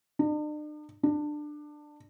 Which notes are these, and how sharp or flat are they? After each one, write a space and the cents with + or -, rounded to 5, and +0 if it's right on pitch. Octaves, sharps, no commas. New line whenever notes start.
D4 +45
D4 +20